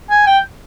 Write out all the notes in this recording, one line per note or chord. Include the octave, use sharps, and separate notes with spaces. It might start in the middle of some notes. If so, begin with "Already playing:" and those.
G#5
G5